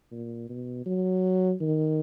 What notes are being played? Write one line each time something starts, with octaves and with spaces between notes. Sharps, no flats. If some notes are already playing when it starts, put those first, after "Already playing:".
A#2
B2
F#3
D#3